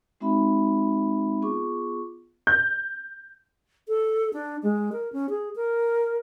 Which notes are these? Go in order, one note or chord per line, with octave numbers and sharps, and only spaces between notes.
G#3 C4 D#4 F#4 E5 B5
B3 F4 G#4 C#6 D6
G6
A4
D4
G#3
A#4
C#4
G#4
A#4